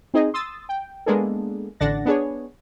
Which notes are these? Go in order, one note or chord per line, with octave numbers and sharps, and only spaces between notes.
C4 D#4 G#4 D#5
C6 D#6 E6 A6
G5
G#3 A#3 B3 D4 G#4 A4
A1 D3 D4 F#5 A6 A#6
B3 D4 G#4 C#5